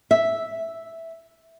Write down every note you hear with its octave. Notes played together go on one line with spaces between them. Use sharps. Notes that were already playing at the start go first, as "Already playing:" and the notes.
E5